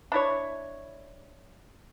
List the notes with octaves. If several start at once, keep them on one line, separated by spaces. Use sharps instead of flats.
D4 E4 C#5